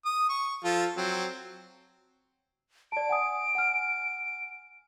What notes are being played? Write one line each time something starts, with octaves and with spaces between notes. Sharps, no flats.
D#6
C#6
F3 F4 A4
F#3 C4
D5 A5 D7
F#5 G#5 D#6
F#5 G#5 F6